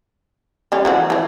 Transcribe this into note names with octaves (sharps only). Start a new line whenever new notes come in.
G3 C#4 F4
E3 F3 F#4
E3 F3